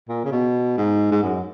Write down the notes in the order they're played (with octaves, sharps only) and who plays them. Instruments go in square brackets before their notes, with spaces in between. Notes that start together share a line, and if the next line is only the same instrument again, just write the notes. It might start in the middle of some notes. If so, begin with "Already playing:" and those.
[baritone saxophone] A#2
C#3
B2
G#2
G#2
F#2